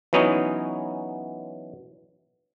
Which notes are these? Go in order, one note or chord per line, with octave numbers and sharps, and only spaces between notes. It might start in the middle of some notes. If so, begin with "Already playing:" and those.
E3 F#3 B3 C#4 D#4